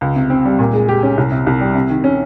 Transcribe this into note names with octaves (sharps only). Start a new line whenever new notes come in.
C#2
C3
C4
G3
A#2
G#3
G4
C#4
C2
C3
C2
G3
C3
D#3
C#4